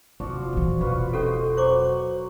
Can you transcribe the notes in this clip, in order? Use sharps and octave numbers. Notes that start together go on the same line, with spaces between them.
F1 F3 F#4 D5
A#2 E3
E1 F4 F#4 B4
C#4 G4 A4 C5 D#5
F#3 C5 C#6 D6